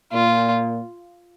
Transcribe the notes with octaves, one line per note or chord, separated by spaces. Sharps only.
A#2 F4